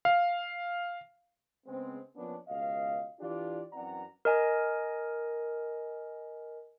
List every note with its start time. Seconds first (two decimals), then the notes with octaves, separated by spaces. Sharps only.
0.05 F5
1.66 C#3 G#3 B3 C4
2.16 F3 A#3 B3 C#4 D4
2.47 C#2 B2 D#5 F5
3.20 E3 D4 F4 G4 D5
3.73 F#2 E3 C4 D5 F#5 A#5
4.25 A#4 D#5 G#5